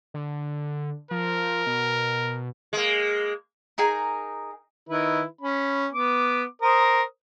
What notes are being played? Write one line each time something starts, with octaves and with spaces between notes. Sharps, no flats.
D3
F3 A#4
B2
G#3 A#3
D#4 G#4 A#4 G#5
D#3 E4 B4
C#4 B5
B3 D6
A#4 C5 D#6